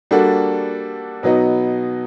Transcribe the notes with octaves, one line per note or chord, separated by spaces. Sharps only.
G3 A#3 D4 F#4 A4
B2 F#3 B3 D#4